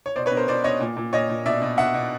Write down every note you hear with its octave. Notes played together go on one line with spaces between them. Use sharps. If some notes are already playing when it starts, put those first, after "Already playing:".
C#5
B2 C5 D5
B4 C#5
B2
A#4 C5
B2 C5 D5
B2 C#5 D#5
A#2
A#2
A#2 C#5 D#5
A#2
B2 D5 E5
B2
B2 E5 F#5
B2